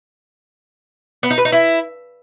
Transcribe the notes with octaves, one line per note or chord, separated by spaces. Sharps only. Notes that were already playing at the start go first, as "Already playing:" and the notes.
B3
D#4
B4
D#4
E4